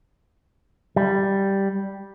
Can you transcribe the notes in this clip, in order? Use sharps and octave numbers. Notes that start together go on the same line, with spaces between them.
G3